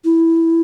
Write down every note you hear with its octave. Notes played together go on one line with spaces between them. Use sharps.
E4